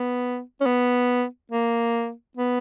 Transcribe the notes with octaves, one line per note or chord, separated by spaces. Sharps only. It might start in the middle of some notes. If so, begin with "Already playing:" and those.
Already playing: B3
C#4
B3
A#3
B3